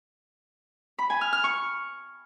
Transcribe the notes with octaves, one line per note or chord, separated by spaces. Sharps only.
B5
G#5
F6
F6
C#6